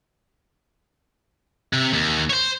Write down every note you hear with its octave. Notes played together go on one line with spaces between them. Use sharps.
C3
D#2
C5 C#5